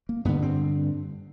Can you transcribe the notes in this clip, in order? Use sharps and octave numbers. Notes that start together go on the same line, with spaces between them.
A#3
G2 D3 B3
C4